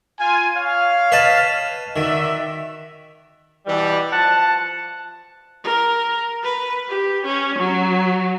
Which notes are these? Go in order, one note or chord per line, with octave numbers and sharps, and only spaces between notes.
F4 G#5
C#5 F5
B4 D#5 A5
D#3 F#4 D5 E5
B2 E3 G3
F3 F#5 A5
A#4
B4
G4
C#4
F#3